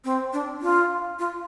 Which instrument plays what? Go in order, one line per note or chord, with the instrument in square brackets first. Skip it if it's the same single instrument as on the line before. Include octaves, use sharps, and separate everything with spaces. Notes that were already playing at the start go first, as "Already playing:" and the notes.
[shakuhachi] C4
D4
F4
F4